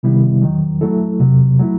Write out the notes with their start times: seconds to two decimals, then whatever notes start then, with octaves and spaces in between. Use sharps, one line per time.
0.03 C3 D#3 G3 B3 E4
0.42 E2 D#3 F#3
0.81 F#3 A3 E4 A4
1.19 E2 C3 F#3
1.60 F#3 A3 E4